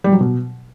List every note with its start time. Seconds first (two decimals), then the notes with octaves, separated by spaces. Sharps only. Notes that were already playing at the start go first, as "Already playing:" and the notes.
0.04 G3
0.12 F#3
0.20 B2